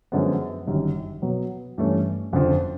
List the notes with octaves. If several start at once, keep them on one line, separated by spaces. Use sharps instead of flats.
F#2 D3 F3 G#3 B3
G1 F#2 D#3 G3
B2 F#3 B3
G2 E3 A3 C#4
F#1 F2 D3 F3